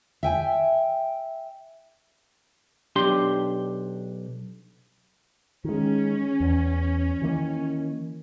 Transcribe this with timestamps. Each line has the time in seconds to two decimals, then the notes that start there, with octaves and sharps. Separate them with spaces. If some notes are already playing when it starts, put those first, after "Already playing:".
0.23 E5 G5 G#5
2.96 B1 D4 G4 C6
5.64 D#3 G#3 C#4
6.40 E2
7.22 D#3 E3 A#3